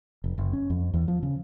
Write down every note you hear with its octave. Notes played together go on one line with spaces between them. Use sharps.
F1
F#1
C#4
F2
E2
F3
C#3